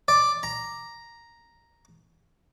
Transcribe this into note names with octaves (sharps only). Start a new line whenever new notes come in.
D5
A#5